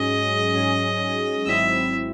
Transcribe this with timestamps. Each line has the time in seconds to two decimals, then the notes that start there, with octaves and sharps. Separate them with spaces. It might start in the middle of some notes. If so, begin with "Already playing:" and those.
Already playing: G#2 F#3 C#4 G#4 D#5
0.53 G#2 F#3 C#4 G#4
1.46 G#1 G#2 F#3 C4 E4 E5